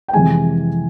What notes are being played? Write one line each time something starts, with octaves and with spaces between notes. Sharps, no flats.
G5
F2 C3 E3 G#3 G#5